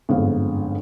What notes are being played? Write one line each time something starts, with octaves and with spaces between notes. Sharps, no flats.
G1 F2 G#2 F5